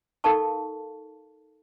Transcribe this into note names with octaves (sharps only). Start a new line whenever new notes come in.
D#4 A4 A#4 F5 A5 C#6